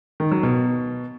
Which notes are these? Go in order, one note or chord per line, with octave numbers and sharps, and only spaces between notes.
D#3
F#3
B2